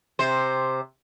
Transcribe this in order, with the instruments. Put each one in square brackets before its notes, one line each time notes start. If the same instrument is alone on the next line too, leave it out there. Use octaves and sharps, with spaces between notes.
[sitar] C3 C5